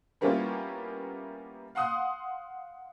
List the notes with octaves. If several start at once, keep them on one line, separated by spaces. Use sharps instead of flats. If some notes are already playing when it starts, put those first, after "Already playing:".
G3 A#3 B3 C#4 E4 F4
F5 F#5 C6 D#6 F#6